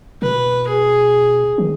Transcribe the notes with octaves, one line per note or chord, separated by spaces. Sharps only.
B2 B4
G#4
D#3